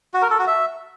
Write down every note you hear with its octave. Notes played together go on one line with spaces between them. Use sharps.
F#4
A#4
A4
F#4
E5